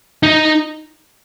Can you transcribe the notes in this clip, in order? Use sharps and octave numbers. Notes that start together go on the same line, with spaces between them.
D#4